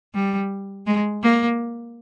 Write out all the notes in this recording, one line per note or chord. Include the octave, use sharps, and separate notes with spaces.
G3
G#3
A#3